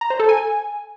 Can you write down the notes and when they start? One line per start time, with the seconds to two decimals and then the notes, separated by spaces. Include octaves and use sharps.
0.01 A#5
0.10 C5
0.20 A4
0.29 G#5